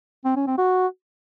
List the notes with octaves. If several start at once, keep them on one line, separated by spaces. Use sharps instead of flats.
C4
C#4
C4
F#4